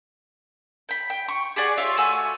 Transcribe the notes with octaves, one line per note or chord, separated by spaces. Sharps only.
G5 B5
G5
C#6
G4 G#4 D5 F#5
F4 C#5 E5
A3 F#4 G#5 E6